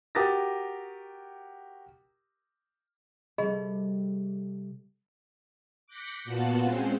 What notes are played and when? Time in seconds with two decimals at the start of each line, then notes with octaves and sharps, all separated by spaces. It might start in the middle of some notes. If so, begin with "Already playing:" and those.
0.15 F#4 G4 A#4 D#6 A6 A#6
3.38 C3 G3 G#4 A4 D#5 B5
5.87 D6 F#6 G6 A#6 B6 C#7
6.24 A#2 B3 F4 F#4 A5 F#6
6.61 G#3 C4 C#4 C5